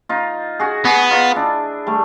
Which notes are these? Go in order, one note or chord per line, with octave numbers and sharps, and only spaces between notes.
D#4 F4
F#4 G#4
B3 F#4 G#4
D#4 F4
D4 E4
G3 A3